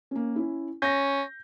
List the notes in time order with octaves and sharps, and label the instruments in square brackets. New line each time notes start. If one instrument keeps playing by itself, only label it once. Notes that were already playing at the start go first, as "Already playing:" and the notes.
[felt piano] A#3 C#4
C#4 E4
[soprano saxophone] C#4 [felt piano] G6 A#6